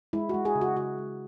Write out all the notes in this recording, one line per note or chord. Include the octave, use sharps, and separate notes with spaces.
G#3 E4
G#3 F#4
G#4
C#3
F#4
C#3 F#4
G#3